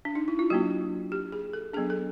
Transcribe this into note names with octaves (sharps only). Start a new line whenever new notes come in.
D4
D#4
E4
F4
F#3 A#3 D4 F#4
G4
G#4
A4
F#3 B3 D4 G#4
A4